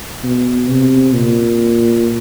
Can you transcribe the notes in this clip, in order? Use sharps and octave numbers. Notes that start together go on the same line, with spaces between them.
B2
C3
A#2